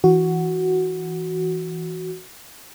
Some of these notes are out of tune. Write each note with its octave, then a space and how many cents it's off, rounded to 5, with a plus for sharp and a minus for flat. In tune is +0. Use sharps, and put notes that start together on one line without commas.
E3 +0 F#4 +0